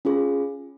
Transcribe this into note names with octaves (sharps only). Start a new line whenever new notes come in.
C#4 F4 G#4